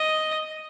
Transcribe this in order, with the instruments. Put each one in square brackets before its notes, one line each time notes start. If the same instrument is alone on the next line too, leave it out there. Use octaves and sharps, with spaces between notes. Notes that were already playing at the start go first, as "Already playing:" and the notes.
Already playing: [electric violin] D#5